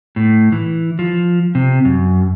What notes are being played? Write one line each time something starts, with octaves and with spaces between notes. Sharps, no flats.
A2
E3
F3
C3
F#2